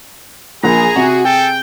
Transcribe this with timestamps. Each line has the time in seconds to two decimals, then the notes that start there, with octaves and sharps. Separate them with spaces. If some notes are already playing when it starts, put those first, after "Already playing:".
0.64 A#1 G#4 A#5
0.96 C3 F#4
1.25 A4 G5